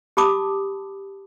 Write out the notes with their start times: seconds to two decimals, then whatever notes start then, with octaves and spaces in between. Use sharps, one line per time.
0.17 G4 A5 B5 D6 D#6